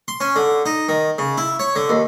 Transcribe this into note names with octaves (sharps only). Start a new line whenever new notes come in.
C6
C#4
D3
D#4
D#3
C#3
E4
C#5
D3
D#2